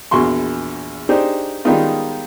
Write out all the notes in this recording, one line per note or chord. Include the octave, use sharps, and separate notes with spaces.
A#1 E2 F#4 C6 C#6
D4 D#4 G4 G#4 C5
D#3 G3 G#3 B3 D#4 F4